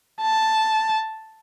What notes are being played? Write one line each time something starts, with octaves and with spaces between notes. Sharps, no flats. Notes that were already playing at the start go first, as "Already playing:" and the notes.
A5